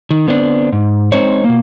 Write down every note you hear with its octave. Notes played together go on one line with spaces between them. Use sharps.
D#3
D3 B3 C4 D4
G#2
G#3 C4 D#4 C5 C#5
B2 A#3